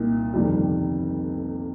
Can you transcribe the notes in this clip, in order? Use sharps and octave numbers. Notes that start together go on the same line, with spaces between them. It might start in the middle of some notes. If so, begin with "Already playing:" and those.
Already playing: C2 A#2 A#3 D#4
G1 F2 C3 D#3 G3